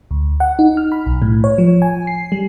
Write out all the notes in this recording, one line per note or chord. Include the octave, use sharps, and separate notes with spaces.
D2
F#5
D#4
F6
B5
B1
A2
C#5
F3
G#5
C7
G3